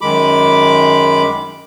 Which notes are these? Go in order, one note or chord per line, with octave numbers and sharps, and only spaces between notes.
F#2 D#3 G#3 B5 D6